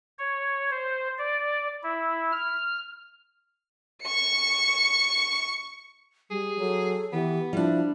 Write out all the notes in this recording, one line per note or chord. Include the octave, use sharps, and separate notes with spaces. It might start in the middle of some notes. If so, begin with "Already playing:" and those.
C#5
C5
D5
E4
F6
C#6 C#7
G3 G#4
F#3 A4
E3 B3 G4
F3 G3 D4 E4